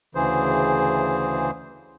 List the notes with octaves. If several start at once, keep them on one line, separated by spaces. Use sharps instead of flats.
D2 C#3 E3 G#4 C5